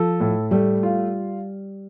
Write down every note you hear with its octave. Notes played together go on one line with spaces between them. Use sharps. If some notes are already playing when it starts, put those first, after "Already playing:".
Already playing: F3 A4
A2
G3 A3
F4